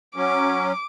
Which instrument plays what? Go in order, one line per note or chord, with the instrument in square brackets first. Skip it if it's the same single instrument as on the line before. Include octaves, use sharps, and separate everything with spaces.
[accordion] F#3 C#4 [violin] D6